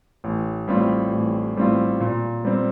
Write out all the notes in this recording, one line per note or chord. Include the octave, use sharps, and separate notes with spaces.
A1
A2 G3 C4 F4
A1
A2 G3 C4 F4
A#2
G3 C4